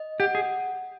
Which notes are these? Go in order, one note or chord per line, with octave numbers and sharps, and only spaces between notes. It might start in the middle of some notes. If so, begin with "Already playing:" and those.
Already playing: D#5
G4 F#5
G#4